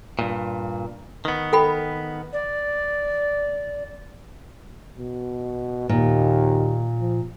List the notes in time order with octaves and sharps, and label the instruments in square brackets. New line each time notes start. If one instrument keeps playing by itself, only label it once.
[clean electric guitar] G2 A#2
D#3 B3
[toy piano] A4 G5 B5
[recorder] D5
[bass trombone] B2
[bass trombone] D#2 [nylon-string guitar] A#2
[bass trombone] F3